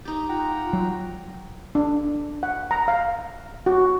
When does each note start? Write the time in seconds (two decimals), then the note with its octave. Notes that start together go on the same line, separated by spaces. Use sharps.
0.05 D#4 G4
0.29 F4 F#5 G5 A#5
0.73 F#3
1.75 D4
2.43 F#5
2.71 A#5
2.88 F5
3.66 F#4